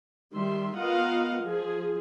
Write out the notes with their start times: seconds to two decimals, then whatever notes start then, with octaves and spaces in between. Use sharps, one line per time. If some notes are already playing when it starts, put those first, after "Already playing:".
0.34 D#3 G3 E5 C6
0.76 B3 F4 A#4 D#5 F5 F#5
1.43 F3 G#4